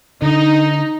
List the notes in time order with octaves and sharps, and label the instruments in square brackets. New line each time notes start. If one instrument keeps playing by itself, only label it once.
[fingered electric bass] D3 [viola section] D#4